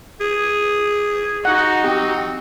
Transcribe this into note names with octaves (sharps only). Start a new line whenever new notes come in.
G#4
D#4 F#4 F#5
C4 G4